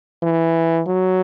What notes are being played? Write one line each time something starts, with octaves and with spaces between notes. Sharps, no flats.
E3
F#3